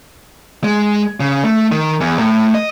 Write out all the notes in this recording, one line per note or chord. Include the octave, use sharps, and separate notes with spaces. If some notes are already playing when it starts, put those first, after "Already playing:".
G#3
C#3
A3
D#3
E2
A2
D#5